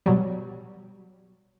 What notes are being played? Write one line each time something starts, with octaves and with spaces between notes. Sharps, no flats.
B2 F#3 G3